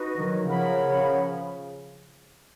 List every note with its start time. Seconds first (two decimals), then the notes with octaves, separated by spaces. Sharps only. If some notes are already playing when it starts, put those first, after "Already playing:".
Already playing: D#4 F#4 B4
0.17 D#3 F#3
0.47 C#3 F3 A#4 C#5 F#5 B5
0.92 C#3 F3